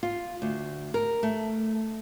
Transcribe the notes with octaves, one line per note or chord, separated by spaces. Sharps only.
F4
D2
A#4
A3